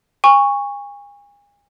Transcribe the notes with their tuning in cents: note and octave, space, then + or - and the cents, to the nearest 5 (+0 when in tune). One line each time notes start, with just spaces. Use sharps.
G#5 -35 C#6 +0